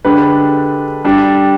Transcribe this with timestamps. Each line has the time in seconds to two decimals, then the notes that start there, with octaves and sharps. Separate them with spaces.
0.05 D3 G#3 D4 G4 B4
1.05 G3 D4 G4